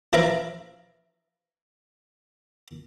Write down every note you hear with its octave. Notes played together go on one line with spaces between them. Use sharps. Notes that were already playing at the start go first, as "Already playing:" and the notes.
E3 F3 B4 E5 F5 A#5